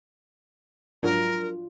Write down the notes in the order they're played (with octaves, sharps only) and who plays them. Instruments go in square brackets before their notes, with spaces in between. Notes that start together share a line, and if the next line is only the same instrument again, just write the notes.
[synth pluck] G#2 F#3 D4 [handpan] F4 [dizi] A#4